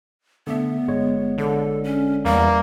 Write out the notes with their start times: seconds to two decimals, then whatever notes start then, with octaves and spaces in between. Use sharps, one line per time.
0.47 D3 A3 B3 E5
0.88 G1 G#3 C#5
1.38 D3 A4
1.84 C#4
2.25 E2 G3 A#3